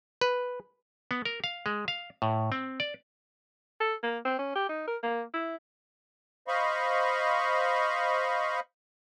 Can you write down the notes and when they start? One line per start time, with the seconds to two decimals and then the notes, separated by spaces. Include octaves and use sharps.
0.21 B4
1.11 B3
1.25 A#4
1.44 F5
1.66 G#3
1.88 F5
2.22 A2
2.52 C4
2.80 D5
3.80 A4
4.03 A#3
4.25 C4
4.39 C#4
4.55 G4
4.69 D#4
4.87 A#4
5.03 A#3
5.34 E4
6.48 C5 D#5 F5 B5 C#6